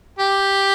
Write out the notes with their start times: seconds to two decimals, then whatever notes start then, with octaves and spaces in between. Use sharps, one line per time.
0.19 G4